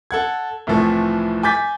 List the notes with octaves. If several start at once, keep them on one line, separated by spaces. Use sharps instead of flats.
A4 F#5 G#6
C2 A2 E3 F3 A3
G#5 D6 G6 A6 B6